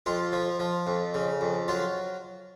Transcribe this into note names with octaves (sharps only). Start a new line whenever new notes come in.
F2 F4
F3
F3
F2
C#3
F2
F#3 F4